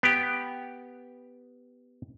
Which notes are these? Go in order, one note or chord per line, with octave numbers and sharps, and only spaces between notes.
B3 G4